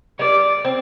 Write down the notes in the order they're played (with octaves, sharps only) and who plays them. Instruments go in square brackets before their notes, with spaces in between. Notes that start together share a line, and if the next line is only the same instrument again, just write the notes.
[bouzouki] G3 [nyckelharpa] D5
[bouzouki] C4